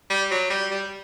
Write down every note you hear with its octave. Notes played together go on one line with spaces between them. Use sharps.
G3
F#3
G3
G3